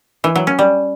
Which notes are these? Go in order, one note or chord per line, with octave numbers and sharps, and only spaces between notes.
E3
F#3
C#4
G3